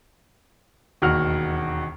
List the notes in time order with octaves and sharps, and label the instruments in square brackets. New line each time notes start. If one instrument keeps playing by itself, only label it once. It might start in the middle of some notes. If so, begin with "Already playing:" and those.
[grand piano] E1 D#2 F#4 F#5 F6